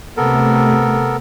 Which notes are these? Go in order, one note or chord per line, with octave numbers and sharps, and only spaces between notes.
C3 A3 B3 A4 A#4